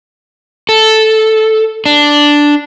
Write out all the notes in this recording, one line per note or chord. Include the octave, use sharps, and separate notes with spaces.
A4
D4